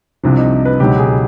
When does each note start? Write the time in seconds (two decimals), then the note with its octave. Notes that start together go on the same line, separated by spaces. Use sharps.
0.23 C2 C3 F3 D4
0.38 D#4
0.65 B4
0.80 C#2 B2 F#3 G4
0.99 G#4